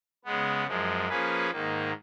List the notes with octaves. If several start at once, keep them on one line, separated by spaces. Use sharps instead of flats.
C#3 G#3 B3
F#2 F3 G#3
F3 A#3 C#4 G#4 B4
G#2 D#3 A#3